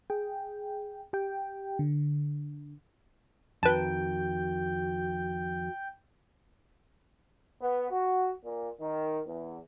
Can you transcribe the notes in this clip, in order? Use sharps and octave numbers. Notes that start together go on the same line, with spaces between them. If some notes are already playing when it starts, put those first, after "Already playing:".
G#4 G5
G4 G5
D3
F2 D#3 F#4 B4 G5 A5
B3
F#4
A#2
D#3
E2